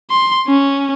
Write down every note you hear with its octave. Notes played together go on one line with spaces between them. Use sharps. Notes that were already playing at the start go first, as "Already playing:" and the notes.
C6
C#4